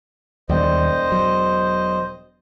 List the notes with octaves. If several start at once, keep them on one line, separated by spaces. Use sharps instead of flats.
E1 D#2 G3 C5 D5 D#5 G5
F#3